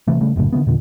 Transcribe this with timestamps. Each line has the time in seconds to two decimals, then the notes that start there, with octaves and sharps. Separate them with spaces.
0.07 C3 E3 A3
0.21 C#3 G3 A3
0.36 F#1 F#2 A2 C#3
0.53 D3 D#3 G#3 B3
0.66 E2 A#2 D3